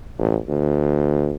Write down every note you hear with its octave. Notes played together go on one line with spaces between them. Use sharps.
A1
D2